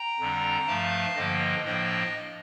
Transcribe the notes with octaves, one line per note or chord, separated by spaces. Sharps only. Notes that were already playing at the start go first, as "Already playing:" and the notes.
Already playing: G5 A#5
F2 D3 G3 D4
G2 F3 A3 F5 A5
G2 D3 F3 A#3 D#5 G5
A2 F3 A#3 D4 D#5 G5